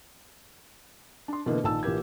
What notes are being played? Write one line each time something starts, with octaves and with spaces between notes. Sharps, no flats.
D4 C6
B2 D3 E3 A#3
A#1 D#3 A5 E6
A#1 E3 A#3 G4 G#6